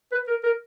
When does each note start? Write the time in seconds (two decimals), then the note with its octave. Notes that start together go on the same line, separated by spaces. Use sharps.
0.12 B4
0.27 A#4
0.44 A#4